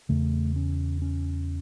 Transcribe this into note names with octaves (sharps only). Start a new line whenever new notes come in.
E2 C#3 A3
C#4
C#4